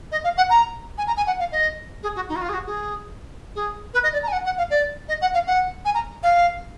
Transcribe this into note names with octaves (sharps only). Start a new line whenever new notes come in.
D#5
F5
F#5
A#5
G#5
A#5
G#5
F#5
F5
D#5
G#4
F#4
D#4
F#4
F4
G#4
F#4
G#4
G#4
B4
D#5
D5
A#5
G#5
F#5
F#5
F5
D5
D#5
F#5
F5
F#5
G#5
A#5
F5